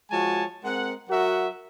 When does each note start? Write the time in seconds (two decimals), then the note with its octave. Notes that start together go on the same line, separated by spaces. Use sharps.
0.11 F3 G#3 F#4 C#5 G#5 A5
0.64 G#3 C4 A#4 F#5
1.09 F#3 F#4 A#4 E5 F#5